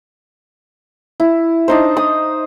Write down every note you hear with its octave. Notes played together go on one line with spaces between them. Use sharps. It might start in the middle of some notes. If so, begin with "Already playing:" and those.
E4
D4 D#4 C5
D#6